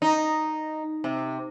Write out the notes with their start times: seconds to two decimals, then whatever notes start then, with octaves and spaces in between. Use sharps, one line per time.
0.02 D#4
1.04 C3